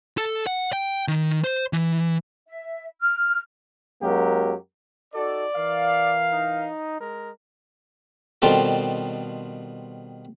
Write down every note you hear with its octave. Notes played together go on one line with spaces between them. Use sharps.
A4
F#5
G5
D#3
C5
E3
E5
F6
F#2 F#3 G#3 A#3 G4 A#4
D#4 F#4 A4 D5
E3 A#4 F5
D#4
G#3 A#4
B2 D#3 G3 C4 F4 A4